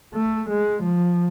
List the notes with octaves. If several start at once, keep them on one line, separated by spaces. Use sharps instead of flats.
A3
G#3
F3